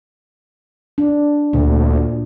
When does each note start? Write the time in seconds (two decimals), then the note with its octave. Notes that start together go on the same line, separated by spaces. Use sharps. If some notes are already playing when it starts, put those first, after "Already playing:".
0.98 D4
1.53 D2 A#2